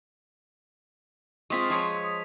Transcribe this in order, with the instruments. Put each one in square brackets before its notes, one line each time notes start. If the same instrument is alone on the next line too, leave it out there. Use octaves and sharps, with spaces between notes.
[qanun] G#3 C4 F4 [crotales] C#6 D#6 B6
[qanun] F3 G#4 C#5
[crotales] D#6